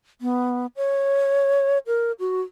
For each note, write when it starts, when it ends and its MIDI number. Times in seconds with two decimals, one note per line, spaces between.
0.21 0.66 59
0.77 1.78 73
1.87 2.12 70
2.20 2.41 66